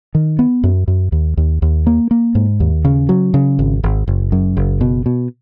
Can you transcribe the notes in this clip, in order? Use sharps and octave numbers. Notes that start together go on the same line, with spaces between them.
D#3
B3
F#2
F#2
D#2
D#2
D#2
A#3
A#3
G#2
D#2
C#3
F#3
C#3
G#1
G#1
F#1
F#2
F#1
B2
B2